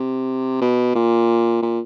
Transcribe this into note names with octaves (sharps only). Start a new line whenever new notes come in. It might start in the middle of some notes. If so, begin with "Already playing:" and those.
Already playing: C3
B2
A#2
A#2